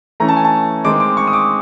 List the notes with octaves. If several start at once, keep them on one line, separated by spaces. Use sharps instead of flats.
E3 A3 C#4 A#5
A5
G#5
A5
D#3 G#3 C4 D#4 D6
D6
C#6
D#6
D6